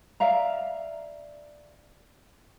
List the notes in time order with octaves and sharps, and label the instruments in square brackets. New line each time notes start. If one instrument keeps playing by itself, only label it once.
[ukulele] D5 E5 F5 A#5